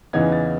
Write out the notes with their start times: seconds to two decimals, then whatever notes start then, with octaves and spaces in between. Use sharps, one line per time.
0.13 E2 C#3 E3 B3 D#4 G#6
0.32 A6